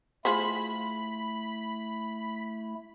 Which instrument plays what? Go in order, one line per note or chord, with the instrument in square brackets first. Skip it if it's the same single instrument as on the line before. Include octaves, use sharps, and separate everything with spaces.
[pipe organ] A3 E4 [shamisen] F4 G#4 C5 [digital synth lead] B5